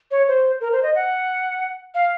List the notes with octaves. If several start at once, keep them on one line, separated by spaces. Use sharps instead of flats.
C#5
C5
A#4
C5
D#5
F#5
F5